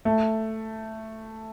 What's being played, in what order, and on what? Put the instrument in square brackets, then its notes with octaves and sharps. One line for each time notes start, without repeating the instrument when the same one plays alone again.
[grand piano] A3